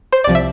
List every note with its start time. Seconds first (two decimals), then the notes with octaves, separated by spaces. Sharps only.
0.12 C5
0.24 C2 C3 F3 D5
0.35 E5